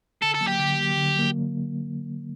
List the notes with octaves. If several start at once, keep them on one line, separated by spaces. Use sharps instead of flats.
D3 A4
A4
F#3 A#3
G4
D3
F#3 A#3
D3
F#3 A#3